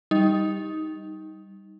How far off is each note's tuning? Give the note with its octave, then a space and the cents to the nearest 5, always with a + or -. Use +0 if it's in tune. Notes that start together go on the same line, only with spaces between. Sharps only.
G3 +0 D#4 +10